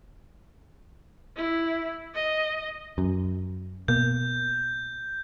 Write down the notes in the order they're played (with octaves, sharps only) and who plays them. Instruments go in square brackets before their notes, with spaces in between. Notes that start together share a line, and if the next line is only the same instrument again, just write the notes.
[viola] E4
D#5
[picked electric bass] F#2
[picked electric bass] B2 A#3 [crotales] G6